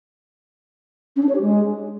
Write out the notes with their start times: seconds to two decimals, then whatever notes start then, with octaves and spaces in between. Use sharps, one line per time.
1.16 C#4
1.22 D4
1.29 C#5
1.35 G4
1.41 G#3